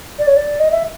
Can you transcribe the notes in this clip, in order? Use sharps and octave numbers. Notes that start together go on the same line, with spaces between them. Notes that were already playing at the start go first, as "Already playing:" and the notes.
D5
C#5
D5
D#5
E5